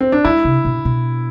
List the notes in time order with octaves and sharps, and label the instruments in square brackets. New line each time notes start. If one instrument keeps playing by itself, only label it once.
[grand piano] C4
D4
[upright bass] G#3 [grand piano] E4
[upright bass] C3
B2
B2